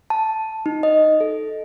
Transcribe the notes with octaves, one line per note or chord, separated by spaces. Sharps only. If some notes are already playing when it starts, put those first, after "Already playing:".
A5
D#4
D#5
A4